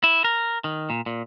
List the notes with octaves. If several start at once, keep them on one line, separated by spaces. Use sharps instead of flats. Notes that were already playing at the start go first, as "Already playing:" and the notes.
E4
A#4
D#3
A#2
A#2